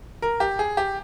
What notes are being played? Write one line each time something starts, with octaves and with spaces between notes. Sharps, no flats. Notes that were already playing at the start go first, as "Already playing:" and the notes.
A#4
G4
G#4
G4